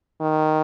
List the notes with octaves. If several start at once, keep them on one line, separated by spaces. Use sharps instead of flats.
D#3